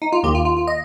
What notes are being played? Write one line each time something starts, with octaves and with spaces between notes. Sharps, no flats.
D#4
F4
D#2 D#3 G4
F4
F4
F4
D#5